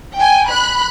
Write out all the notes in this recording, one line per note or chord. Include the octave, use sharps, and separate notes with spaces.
G5 G#5
B5 F#6